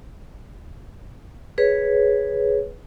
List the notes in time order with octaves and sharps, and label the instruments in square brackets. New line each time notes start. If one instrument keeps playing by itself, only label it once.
[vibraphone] G#4 B4 C#5